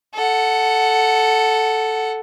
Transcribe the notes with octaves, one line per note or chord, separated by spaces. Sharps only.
A4 F#5